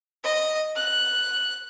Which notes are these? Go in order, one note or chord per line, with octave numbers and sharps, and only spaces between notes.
D#5
F#6